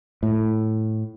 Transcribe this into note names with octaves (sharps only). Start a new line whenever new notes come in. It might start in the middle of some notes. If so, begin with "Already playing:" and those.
A2